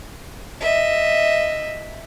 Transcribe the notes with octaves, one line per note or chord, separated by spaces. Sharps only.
D#5 E5